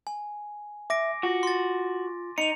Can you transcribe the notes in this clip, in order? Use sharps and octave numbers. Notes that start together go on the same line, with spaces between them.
G#5
E5 D6 A#6 D7
F4 F#4
C6 A6
D#4 C#7 F7